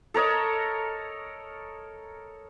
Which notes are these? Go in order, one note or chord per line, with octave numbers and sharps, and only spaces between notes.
A4 A#4 C#5 D#5